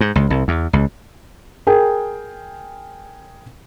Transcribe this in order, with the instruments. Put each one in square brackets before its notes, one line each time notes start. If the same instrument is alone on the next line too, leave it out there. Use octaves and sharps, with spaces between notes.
[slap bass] G#2
C#2
C2
E2
C#2
[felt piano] G#4 A#4 G5